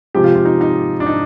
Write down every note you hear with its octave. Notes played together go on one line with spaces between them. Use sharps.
C3 F3 G#3 G4
F4
F4
D#4
D#4
D4
D#4